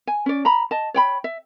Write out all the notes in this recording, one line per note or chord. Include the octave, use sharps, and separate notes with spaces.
G#5
C#4 D5
A#5 B5
D#5 A5
C#5 G5 B5
E5